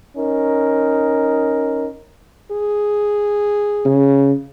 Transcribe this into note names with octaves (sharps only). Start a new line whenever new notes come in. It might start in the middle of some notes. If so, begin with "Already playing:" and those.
C#4 D#4 A#4
G#4
C#3